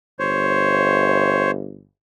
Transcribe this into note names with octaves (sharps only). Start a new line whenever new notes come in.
G1 C5 C#5